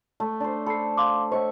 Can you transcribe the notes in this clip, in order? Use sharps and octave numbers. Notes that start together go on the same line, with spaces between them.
A3
D4 C5
A4 B5 C7
F5 C6 D6
C5 C#5 D#5 E5 F#5 C#6